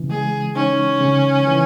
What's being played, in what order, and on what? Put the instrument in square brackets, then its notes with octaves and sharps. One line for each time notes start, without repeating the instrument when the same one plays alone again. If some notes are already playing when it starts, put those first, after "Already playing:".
Already playing: [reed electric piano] C#3 E3
[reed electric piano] G#3 [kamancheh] G#4
[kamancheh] C#4 [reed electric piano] D#4
[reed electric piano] C#3
E3